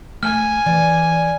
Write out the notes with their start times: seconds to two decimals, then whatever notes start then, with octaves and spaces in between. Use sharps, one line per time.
0.23 A3 G#5 F6
0.66 E3 D5